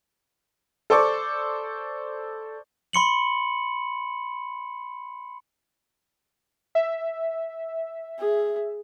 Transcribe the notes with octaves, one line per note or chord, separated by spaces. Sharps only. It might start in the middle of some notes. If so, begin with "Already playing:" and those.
A4 C5 D5 A5 C#6 D6
B5 C6 C#7 F#7
E5
G#4